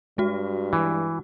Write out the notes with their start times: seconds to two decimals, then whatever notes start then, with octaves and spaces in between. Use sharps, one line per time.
0.18 G2 G#3 F#4
0.73 E3